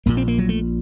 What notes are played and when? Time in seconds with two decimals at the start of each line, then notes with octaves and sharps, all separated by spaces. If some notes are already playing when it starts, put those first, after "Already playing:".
0.06 A#1 A#2 A#3
0.17 C4
0.28 A#3
0.38 F#3
0.49 A3